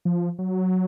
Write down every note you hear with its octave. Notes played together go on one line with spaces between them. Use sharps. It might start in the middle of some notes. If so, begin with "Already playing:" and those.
F3
F#3